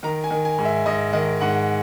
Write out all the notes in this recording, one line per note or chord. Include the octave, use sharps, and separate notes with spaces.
D#3 A#5
G#5
D#3
G#5
G#2
E5
G#2 D#5
D#3 D#5
G#2 F#5